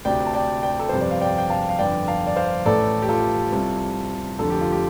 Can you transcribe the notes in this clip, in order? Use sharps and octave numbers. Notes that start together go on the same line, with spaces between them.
D2 C3 D5 G5
A5
D5 G5
D5 G5
A4
G1 F2 C3 C5
D5
F5
D5 G5
G5
F5 A5
F5
G1 F2 D3 D5 G5
F5 A5
D5
C5 F5
A1 A2 A4 D5
G4
F4 A4
C2 C3
F1 F2 D3 A4
G4
F4
G4